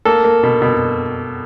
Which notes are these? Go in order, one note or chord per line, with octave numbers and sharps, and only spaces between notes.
A#3 A4
A#3
B2
B2